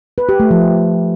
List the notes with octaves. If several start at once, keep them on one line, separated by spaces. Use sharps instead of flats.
B4
G4
A3
F3